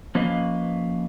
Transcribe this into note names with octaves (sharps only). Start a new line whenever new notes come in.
F3 A#3 C#4 B4 D#5 F5